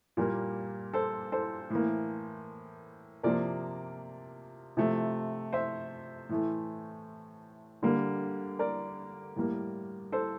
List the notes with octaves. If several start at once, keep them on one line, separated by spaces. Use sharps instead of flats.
A#2 G3 A#3
A4 C5
A4 C5
A2 E3 A#3
C3 F3 A#3 A#4 D5
C3 F3 A3
C5 E5
A2 E3 A3
D3 G3 A#3
A#4 D5
A2 G3 A#3
A4 C5